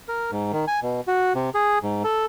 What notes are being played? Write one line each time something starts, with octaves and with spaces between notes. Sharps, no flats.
A#4
G#2
D#3
G#5
B2
F#4
C3
G#4
G#2
A4